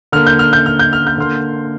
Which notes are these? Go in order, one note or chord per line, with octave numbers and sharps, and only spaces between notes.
D3 A#3 F6
G6
F6
G6
F6
G6
F6
G6
D3 A#3 C6 F6